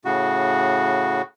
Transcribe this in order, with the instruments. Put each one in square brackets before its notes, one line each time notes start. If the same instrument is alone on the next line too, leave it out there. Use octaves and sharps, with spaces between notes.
[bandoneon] A2 C#3 F#4